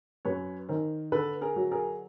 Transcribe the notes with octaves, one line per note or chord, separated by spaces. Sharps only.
F#2 B4 C#5
D#3 A#4 C5
D3 A4 B4
G#4 A#4
F#3
G#4 A#4